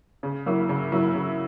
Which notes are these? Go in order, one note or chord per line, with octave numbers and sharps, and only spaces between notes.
C#3
F#3 A#3 E4
C#3
F#3 A#3 E4
C#3